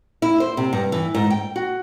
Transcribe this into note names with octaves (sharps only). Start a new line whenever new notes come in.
E4
C5
C3
G2
E3
G#2
G5
F#4